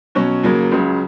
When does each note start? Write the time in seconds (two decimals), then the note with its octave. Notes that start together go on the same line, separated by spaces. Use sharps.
0.15 B2 F#3 C#4
0.43 D#2 C#3 F#3 A#3
0.71 C#2 C#3 F#3